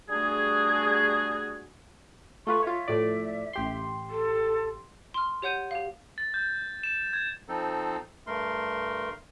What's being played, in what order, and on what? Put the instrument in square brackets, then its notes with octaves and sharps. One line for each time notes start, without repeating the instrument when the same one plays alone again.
[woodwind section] G3 A3 D4 F#4 G#4
[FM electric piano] A3 F4 B4 [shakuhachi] C#6
[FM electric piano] F4 C#5 [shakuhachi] E5
[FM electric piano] A2 F3 D5
A1 G4 C6
[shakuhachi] A4
[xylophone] C6 F6
G4 C#5 F#5 G6 D#7
G4 F5
[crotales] A6
G6
E7
G#6
[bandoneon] F3 C4 D#4 A4
G2 A3 A#4 C6